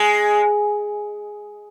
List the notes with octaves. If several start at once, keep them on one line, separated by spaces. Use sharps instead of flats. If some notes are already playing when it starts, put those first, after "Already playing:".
Already playing: G#3